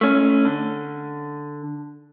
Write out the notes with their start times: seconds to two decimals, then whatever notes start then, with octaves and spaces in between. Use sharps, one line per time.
0.01 A3 C#4
0.45 D3